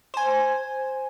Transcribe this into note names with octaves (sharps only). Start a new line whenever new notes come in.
C5 G#5